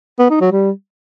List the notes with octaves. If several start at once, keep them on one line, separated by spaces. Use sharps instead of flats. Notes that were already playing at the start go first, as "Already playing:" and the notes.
B3
D#4
F#3
G3